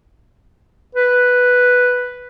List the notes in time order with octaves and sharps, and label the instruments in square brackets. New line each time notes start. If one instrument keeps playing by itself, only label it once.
[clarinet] B4